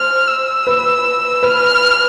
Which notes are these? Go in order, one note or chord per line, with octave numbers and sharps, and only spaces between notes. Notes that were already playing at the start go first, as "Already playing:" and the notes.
Already playing: C5 F6
E6
B4
B4 F6